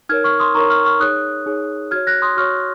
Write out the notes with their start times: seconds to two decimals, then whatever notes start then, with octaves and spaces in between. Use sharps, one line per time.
0.09 D#4 A#4 C#5 F6 G#6
0.24 C#6 F6
0.40 C6 D#6
0.55 D#4 A#4 C#5 A#5 C#6
0.70 C#6 F6
0.85 C#6 F6
1.00 D#4 G#4 C#5 D#6 F#6
1.46 D#4 G#4 C#5
1.91 F#4 C#5 F6 G#6
2.07 F#6 A#6
2.22 C6 D#6
2.37 F#4 C#5 C#6 F6